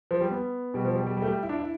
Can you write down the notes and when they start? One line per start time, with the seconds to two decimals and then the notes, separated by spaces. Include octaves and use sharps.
0.11 F3
0.20 G3
0.31 B3
0.74 B2 G3
0.85 F3
0.96 G3
1.07 G3
1.17 G3
1.22 A3
1.28 G3
1.43 E4
1.49 D4
1.59 E4